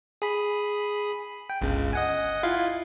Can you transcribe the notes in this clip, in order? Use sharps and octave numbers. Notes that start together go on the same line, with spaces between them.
G#4 B5
G5
G1 C#2 C#3
D#5 F#5 G#5
E4 F4 F5